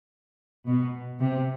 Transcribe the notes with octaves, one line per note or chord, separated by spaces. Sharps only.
B2
C3